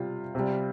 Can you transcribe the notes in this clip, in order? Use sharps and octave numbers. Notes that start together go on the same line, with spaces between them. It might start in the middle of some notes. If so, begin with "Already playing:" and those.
Already playing: C3 G3 F4
C3 G3